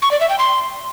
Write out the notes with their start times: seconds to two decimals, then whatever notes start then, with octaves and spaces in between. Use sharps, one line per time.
0.02 C#6
0.11 D5
0.20 E5
0.30 G5
0.39 C6